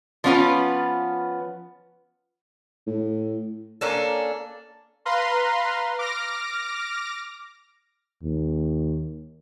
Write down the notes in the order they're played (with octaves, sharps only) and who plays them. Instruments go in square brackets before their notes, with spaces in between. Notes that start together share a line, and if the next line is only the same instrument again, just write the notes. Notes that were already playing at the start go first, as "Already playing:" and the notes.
[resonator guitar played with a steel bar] F3 B3 C#4 E4 F4 B4
[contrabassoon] A2
[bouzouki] A#3 C#4 D4 A4
[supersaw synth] B4 F5 A#5 C6
D6 F6 A#6
[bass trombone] D#2